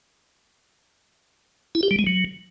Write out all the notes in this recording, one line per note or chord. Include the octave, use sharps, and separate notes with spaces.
E4
G4
G3
G#3
F#3